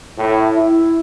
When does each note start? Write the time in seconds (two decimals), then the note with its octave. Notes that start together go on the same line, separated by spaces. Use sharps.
0.18 A2
0.55 E4